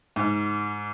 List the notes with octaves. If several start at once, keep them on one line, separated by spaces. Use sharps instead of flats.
G#2